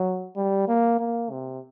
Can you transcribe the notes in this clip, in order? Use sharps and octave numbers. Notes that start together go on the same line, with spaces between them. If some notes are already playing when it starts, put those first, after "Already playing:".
Already playing: F#3
G3
A#3
A#3
C3